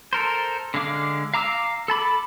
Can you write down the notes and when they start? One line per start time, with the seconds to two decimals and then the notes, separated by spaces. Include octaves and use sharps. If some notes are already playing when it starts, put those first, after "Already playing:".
0.13 A4 A#4 C5
0.74 D3 G#3 F5 D6
1.34 F5 A#5 D6 E6
1.88 A4 A5 B5 D6